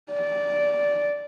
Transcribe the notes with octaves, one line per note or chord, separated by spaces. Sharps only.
D5